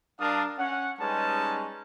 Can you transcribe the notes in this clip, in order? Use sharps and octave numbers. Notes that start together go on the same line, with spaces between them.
G3 D4 A#4 F5 A5 D#6
C#4 F#5
G3 G#3 C#4 D#4 B4 A5